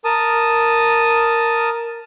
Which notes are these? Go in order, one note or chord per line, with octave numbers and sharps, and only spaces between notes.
A#4 A5 D#6